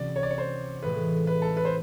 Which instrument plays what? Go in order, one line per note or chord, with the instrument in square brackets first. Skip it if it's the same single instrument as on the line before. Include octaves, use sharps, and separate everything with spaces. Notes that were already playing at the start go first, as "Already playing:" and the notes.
Already playing: [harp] C3 E3 G#3 C#4 F#4 [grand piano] D5
[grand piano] C#5
D5
C#5
C5
[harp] A2 E3 G#3 C#4 F4 [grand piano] B4
[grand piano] B4
A4
B4
C5